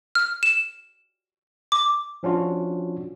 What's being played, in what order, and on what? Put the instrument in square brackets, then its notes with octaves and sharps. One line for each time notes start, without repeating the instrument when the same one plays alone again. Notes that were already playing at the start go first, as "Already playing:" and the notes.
[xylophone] F6
E7
D6
[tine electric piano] F3 C#4 D4 F4 F#4